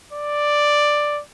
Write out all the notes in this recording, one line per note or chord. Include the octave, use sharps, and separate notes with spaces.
D5